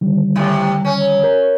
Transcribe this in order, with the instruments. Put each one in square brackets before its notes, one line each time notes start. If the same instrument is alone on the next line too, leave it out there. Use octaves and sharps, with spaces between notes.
[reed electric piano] D3 D#3 G3
[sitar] A2 C3
C#4
[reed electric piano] A#4